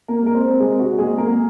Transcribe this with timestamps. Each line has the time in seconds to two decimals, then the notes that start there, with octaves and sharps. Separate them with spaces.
0.08 A#3 A#4
0.22 G#3 A#4
0.34 C4 C5
0.60 C3 G#3 G#4
0.79 F#4
0.98 F#3 G#3 A#3 G#4
1.18 A#3 A#4